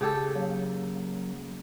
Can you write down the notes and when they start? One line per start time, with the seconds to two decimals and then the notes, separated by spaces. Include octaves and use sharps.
0.01 C#3 G4 A4
0.35 F#3 A#3